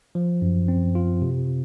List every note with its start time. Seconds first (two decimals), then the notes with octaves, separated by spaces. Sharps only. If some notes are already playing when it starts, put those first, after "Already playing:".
0.15 F3
0.42 F#2
0.68 C4
0.95 F4
1.22 C3